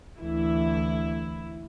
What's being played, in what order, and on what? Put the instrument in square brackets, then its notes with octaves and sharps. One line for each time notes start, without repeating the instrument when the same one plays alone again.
[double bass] D2 E3 [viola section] E4